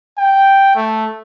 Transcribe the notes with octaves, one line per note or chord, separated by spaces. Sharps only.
G5
A3